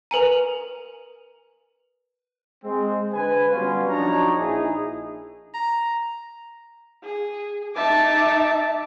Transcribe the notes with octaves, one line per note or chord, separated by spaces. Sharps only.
A#4 B4 G#5 A#5
G#3 C4
D3 B4 G#5
F#3 G3 B3 C#4 F4
F3 D4 D#4 F#4 C#5 A#5
A#1 D#4 E4 G#4
A#5
G#4
D#4 E5 A5 D6